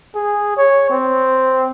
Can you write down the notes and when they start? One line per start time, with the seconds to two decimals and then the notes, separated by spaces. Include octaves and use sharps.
0.15 G#4
0.57 C#5
0.90 C4